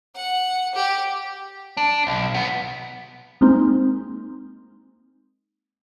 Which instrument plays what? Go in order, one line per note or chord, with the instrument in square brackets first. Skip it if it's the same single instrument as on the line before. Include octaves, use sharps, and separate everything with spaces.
[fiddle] F#5
G4
[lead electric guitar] D4
B1
B1 B3
[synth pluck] G#3 A#3 C4 D#4